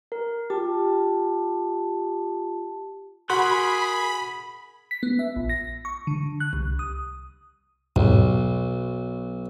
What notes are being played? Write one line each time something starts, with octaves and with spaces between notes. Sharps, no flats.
A#4
F4 G4 A5
F#4 G#4 A#4 B5 C6 F#6
B6
B3
E5
A#1
A#6
C#6
D3
F#6
C2
D#6
B1 E2 G#2